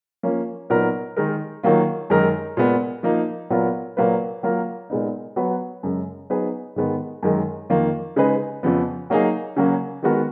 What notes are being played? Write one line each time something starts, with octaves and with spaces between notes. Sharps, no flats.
F3 A#3 C#4 F4
A#2 F#3 B3 D#4 A#4
D#3 G#3 D#4 A#4
D#3 F#3 A#3 F4
F#2 D#3 G#3 D#4 A#4
A#2 G#3 B3
F3 A#3 D#4
A#2 F#3 B3 F4 A#4
A#2 F#3 A#3 F4 B4
F#3 A#3 F4 A#4
A#2 G#3 B3 D#4
F#3 B3 F#4 B4
F#2 C#3 G#3
F#3 B3 D#4 G#4 B4
G#2 D#3 G#3 B3
F#2 D#3 G#3
F2 D#3 A#3 F4
C#3 G#3 D#4 G#4 B4
F2 C#3 F3 B3
F#3 A#3 D#4 G#4
C#3 F#3 A#3 C#4
D#3 G#3 B3 F#4 A#4